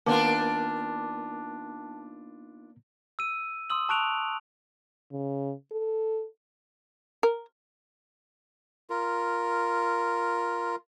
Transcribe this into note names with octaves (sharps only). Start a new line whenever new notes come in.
D#3 A#3 B3 D4 F4 A5 D6
E6 D#7
C6 D#6 E6 F#7
A5 C#6 F#6 D7 F7
C#3
A4
A#4
F4 A#4